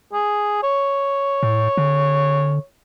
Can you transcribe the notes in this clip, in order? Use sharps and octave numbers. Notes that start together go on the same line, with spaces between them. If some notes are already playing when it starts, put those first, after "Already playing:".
G#4
C#5
A2
D3